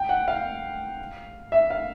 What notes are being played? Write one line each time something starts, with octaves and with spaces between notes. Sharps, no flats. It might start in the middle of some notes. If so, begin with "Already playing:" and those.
Already playing: G5
F#5
F5
E5
F5